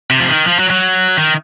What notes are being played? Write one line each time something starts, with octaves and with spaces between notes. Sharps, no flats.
C3
F3
D#3
F3
F#3
F#3
D#3